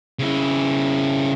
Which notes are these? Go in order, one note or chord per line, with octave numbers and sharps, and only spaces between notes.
C#3 E4